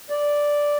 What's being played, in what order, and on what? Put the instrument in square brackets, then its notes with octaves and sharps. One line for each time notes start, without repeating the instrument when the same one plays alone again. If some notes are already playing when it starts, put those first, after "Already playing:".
[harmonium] D5